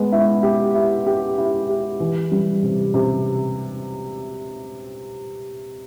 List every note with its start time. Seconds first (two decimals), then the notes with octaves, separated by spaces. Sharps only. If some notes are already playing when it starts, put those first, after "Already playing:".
Already playing: G#3 B3
0.12 E4
0.43 G4
0.75 E4
1.06 G4
1.38 E4
1.69 G4
2.00 E3
2.32 G3
2.63 C3
2.94 C3